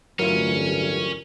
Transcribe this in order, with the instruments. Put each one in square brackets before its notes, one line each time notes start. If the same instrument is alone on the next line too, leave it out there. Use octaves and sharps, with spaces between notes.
[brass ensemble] A1 D2 G2 [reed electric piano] F#3 E4 F4 [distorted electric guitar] C#4 [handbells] A#4